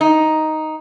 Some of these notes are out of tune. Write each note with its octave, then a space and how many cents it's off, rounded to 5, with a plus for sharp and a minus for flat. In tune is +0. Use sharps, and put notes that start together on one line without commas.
D#4 +5